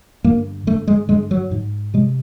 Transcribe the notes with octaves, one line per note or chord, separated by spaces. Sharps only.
G2 D3 A#3
G2 D3 A3
G#3
G2 D3 G#3
F#3
G#2
C3 G#3